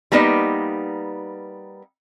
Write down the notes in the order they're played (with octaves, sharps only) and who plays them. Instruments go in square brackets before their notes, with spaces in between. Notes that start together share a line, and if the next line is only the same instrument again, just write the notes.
[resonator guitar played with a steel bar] G3 A#3 B3 D#4 B4 D5